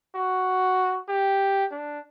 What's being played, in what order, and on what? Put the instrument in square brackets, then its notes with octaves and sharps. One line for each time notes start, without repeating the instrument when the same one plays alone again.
[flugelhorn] F#4
G4
D4